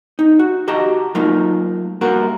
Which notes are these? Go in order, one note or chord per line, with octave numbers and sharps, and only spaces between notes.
D#4
F#4
F#4 G4 D#5 A5 A#5
F#3 A3 A#3 D#4 F4
G2 A#3 F#4 A#4